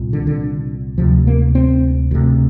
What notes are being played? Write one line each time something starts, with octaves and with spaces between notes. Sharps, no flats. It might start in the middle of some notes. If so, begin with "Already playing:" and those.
Already playing: C2 A#2
D3
D3
D2 C3 F3
A#3
C4
D2 C3